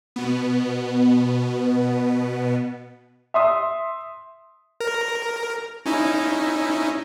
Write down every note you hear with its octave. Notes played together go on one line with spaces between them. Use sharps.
B2 B3
E5 C6 D#6
A#4
C#4 D#4 E4